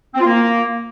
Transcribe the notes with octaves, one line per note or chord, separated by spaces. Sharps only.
C4
F4
A#3